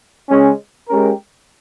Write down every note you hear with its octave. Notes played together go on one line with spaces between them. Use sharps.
C#3 G#3 C#4
G#3 C#4 G4 A#4